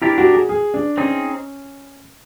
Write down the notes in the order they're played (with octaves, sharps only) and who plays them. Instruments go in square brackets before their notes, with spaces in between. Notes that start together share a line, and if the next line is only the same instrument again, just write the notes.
[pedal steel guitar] D4 G4 A#4 [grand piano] E4
[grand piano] F#4
G#4
G#4
D4
[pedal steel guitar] C4 D#4 G#4 [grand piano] C#4